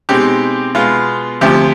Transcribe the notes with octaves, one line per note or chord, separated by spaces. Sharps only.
B2 G#3 C4 D#4 G4
B2 G#3 B3 F4
D2 C3 F3 G4